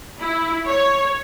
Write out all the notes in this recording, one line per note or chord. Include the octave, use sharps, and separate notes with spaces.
E4
C#5